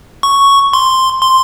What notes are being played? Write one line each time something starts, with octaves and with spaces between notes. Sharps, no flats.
C#6
C6
C6